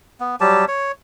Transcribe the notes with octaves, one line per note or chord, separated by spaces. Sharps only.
B3
F#3 G3 G4 A5
C#5